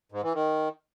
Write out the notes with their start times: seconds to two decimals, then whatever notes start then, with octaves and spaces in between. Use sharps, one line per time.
0.12 G#2
0.23 E3
0.34 D#3